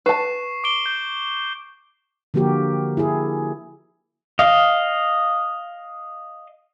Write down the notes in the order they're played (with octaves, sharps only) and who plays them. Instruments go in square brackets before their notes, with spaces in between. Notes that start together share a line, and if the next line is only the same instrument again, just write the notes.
[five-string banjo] B4 A5 [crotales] C#6 C7 E7
[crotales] D6 D7 G7
G6
[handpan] D3 F3 A#3 F#4 G4 A#4
E4 G#4
[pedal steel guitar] D#5 F5